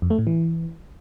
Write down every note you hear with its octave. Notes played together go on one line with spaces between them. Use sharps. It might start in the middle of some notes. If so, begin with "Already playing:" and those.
F2
A3
A2
E3